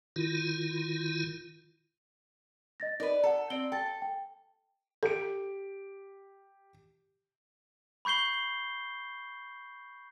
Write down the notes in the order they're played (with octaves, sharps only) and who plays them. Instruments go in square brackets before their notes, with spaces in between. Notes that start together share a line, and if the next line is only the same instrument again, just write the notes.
[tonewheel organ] D#3 E4 F4
[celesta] D#5 A6 A#6
[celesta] D#4 A#4 B5 [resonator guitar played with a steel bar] B4 D5
[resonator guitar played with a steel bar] A4 [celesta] F#5 A#5
[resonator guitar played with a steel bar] C4 [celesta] D5 D7 G7
[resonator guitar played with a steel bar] A4 [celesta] G5 A6
[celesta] G5
[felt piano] G4 D7 [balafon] A4
[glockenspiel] B5 C#6 G6 C7 G7